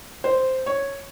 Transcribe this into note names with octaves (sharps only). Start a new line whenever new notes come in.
C5
C#5